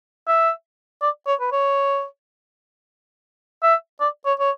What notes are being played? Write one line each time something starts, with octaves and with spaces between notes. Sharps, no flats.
E5
D5
C#5
B4
C#5
E5
D5
C#5
C#5